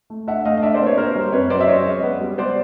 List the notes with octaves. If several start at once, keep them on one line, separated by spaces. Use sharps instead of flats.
A3
D4 E5 F#5
A3 D#5 F5
D#5
D4 D5 E5
C5 D5
A#3
B4 C#5
A#3 A#4 C5
G3
F#2 B4 C#5
F#3 C5 D5
E5
C#4 C#5 D#5
G#3
B3
G3
B3 C5 D5